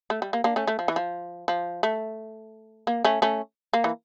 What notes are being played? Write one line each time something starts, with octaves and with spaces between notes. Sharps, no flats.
A3
G3
A#3
A#3 D4
A3 C#4
A3
F3
E3
F3
F3
A3
A#3
A3 C#4
A3 C#4
A#3
E3